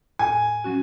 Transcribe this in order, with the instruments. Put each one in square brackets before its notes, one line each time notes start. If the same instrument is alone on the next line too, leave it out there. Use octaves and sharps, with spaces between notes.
[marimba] A2 [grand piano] G#5
[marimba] F#3 C#4 F#4